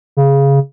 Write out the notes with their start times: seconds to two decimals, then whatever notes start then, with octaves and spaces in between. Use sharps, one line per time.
0.17 C#3